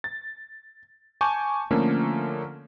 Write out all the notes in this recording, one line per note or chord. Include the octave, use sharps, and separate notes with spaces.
A6
G#5 A5 C#6 D6 G6
D3 F3 A3 A#3 C#4